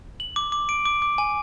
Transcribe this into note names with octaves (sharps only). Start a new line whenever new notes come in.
F#7
D6
D6
D7
D6
D6
G#5